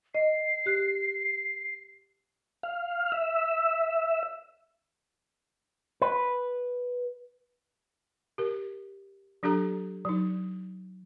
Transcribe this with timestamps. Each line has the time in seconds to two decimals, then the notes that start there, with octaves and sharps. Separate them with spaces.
0.15 D#5 C7
0.66 G4 F#6
2.63 F5
3.12 E5
6.02 B4
8.38 G4 A#4
9.43 F#3 D4 G4 A4 A#5
10.05 F#3 D#4